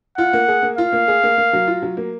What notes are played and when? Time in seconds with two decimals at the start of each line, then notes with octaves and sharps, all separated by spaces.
0.18 F4 F#5
0.33 A#3
0.48 G#4
0.63 A#3
0.78 F4 F5
0.92 A#3
1.08 G#4
1.23 A#3
1.38 A#3
1.53 F#3
1.67 F4
1.82 F#3
1.97 A#3